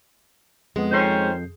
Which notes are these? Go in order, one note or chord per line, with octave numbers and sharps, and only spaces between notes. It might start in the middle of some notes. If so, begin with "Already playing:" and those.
F2 G#3 B3
F2 D#3 C#4 C5 G6 C7